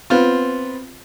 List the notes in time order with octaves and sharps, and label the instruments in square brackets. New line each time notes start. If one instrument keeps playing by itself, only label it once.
[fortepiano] B3 C4 F4